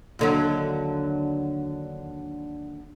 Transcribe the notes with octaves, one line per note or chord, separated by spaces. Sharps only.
D#2 D3 F#3